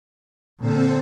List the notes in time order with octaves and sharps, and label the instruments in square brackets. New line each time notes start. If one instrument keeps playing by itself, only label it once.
[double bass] A#2 D3 [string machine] C4 A4 C5